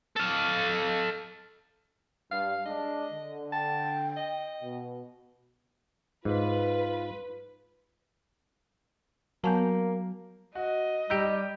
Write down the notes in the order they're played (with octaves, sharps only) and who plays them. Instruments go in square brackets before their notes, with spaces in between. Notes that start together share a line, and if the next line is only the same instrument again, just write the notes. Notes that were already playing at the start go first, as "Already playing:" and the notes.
[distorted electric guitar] A4 F5
[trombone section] G2 [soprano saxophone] F5
[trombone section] G#3 D4 [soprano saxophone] D#5
[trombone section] D3
[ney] G5 [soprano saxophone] A5
[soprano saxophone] D#5
[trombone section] B2
[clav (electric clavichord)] G#2 [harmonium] F4 [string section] B4
[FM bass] F#3 [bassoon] A#3 [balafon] B3 G#5 A5
[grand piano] F#4 [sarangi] D#5
[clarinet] G3 [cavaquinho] D#4 G4 [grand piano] E6 G6 D7